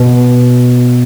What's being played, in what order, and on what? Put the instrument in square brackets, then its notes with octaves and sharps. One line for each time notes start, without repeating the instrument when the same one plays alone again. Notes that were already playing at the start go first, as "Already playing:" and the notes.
Already playing: [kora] B2